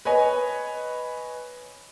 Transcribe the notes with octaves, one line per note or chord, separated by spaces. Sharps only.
B4 C#5 D#5 G#5